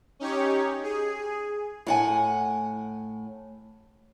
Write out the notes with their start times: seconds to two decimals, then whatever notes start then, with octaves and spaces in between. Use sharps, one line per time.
0.19 C#4 D#4 G4 C#5
0.83 G#4
1.87 A2 F#5 G#5